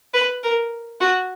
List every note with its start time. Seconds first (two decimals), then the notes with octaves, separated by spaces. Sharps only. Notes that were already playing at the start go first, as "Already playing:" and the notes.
0.14 B4
0.43 A#4
1.00 F#4